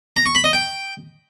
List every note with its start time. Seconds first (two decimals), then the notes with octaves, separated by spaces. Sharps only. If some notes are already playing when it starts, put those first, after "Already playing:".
0.16 A#5
0.26 C#6
0.35 B5
0.44 D#5
0.53 G5